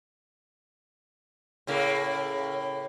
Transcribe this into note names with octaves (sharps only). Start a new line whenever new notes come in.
A2 C#3 A#3